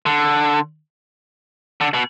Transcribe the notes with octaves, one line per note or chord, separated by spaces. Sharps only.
D3
D3
B2